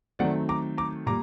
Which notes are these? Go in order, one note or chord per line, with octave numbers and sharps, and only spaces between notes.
D#3 F#3 A3 C4 D5 F#5
A#5 D6
A#5 D6
A#2 G3 A#5 D6